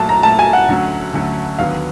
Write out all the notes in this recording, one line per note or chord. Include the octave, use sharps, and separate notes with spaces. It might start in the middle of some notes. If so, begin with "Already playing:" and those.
Already playing: A#2 F#3 A3 A5
A#5
A#2 F#3 A3 A5
G#5
F#5
D2 D3 F#3 A3 C#4
D2 D3 F#3 A3 C#4
D#2 D3 F#3 B3 F5